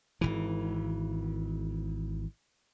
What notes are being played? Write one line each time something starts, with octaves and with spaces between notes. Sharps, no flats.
G#1 C#2 E3